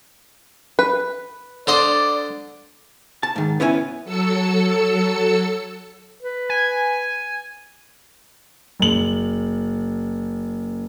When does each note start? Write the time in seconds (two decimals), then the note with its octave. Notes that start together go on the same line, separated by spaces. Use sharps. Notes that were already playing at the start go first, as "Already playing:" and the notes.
0.79 B4
1.67 D3 C5 D5 D#5
3.23 A5
3.36 G#2 D#3
3.60 B3 C#4 E4 C#5 G#5
4.04 F#3 A4 E6 C#7
6.22 B4
6.49 G#5
8.80 F#1 F#7